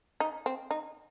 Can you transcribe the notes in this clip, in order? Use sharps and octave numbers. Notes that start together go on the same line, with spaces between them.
D#4
C4
D#4